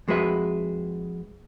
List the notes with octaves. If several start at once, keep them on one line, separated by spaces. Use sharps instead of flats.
F2 G#3 F#4 B4 E5